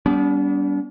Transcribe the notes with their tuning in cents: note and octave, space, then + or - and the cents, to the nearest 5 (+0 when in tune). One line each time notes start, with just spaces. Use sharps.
G3 +0 B3 -5 D4 -45